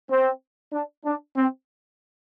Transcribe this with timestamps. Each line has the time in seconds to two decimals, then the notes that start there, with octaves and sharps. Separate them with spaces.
0.11 C4
0.73 D4
1.05 D4
1.37 C4